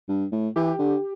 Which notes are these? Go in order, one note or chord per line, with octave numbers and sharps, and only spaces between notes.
G2
A2
E3 G4
D3